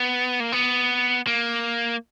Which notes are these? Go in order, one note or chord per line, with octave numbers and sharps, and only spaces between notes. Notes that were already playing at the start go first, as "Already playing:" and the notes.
Already playing: B3
A#3
B3
A#3